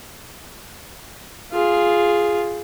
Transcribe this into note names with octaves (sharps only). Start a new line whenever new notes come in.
F4 G#4